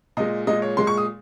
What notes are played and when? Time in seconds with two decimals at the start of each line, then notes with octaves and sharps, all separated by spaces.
0.17 A#2 G#3 D#5
0.47 A#2 G#3 D#5
0.62 C#5
0.77 A#2 G#3 C6
0.87 C#6
0.97 D#6